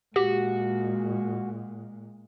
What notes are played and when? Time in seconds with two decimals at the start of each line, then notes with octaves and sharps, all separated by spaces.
0.16 A#2 G#3 F#4 G4